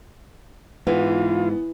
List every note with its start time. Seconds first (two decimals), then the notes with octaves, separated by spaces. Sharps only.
0.87 G#2 E3 B3 F4